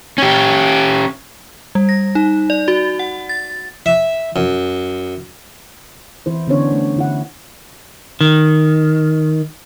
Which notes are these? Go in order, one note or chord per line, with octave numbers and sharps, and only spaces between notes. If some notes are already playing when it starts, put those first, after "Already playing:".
C#4 G4
G3
A#6
D#4
D5
F#4
F#5
A6
E5
F#2
E3 E4 C5
D3 B3 C#4 D4 C5 C#5
A3
D3 E4 F#5
D#3